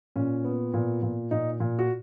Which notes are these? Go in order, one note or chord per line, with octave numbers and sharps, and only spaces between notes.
A#2 C#4
B3
A#2
A#2
A#2 D#4
A#2
F#4